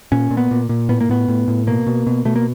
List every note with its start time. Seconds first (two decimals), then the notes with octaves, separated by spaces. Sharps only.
0.12 A#2 C#4
0.31 A#2
0.37 B3
0.51 A#2
0.69 A#2
0.89 A2 B3
1.01 A#3
1.09 A2 B3
1.28 A2
1.48 A2
1.67 B2 A#3
1.87 B2
2.07 B2
2.25 B2 A3
2.36 A#3